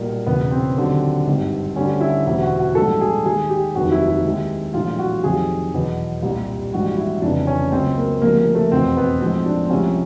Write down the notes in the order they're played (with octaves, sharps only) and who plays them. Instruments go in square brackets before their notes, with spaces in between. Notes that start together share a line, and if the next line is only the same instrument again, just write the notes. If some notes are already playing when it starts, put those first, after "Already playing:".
Already playing: [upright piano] B1 A#2 G3 A#3
E1 E2 C#3 B3
C4
D#2 D3 F#3
G#1 G2 D#3 G3
D2 D3 G3 C#4
E4
E1 D2 C3 E3 E4
F#4
F#4
A#1 G#2 E3 G3 A4
G#4
D#2 D#3 G#3 G#4
G4
F1 D#2 D#3 F#3 F#4
E4
E4
D#2 D#3 G#3
A#1 A2 E3 G3 F4
F#4
F2 C3 D#3 F#3 G#4
E2 B2 F#3
C2 A#2 G3
A#1 G#2 E3 G3 F#4
E4
F1 F2 C#3 E3 D4
C#4
C#2 C#3 F#3 C4
A#3
D2 C3 F3 G#3 A#3
A#3
A3
F1 E2 B2 C4
B3
B1 A2 F3 G#3 C4
D4
C4
C2 C3 F3 G#3 C#4